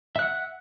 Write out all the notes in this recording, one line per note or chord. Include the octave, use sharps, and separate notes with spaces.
E5 F#5 F#6